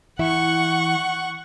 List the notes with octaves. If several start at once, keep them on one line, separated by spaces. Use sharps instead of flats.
E3 E4 E5 F#5 C#6